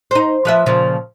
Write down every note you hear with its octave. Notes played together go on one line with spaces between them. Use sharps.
D#4 C5
F3 B4 E5
A#2 C#3 F3